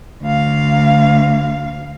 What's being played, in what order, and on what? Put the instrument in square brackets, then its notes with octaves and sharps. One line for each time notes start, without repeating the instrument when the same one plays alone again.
[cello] D2 F5